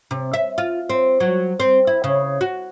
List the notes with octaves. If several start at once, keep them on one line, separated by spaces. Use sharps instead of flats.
C3
E5
F4
C4
F#3
C4
E4
C#3
F#4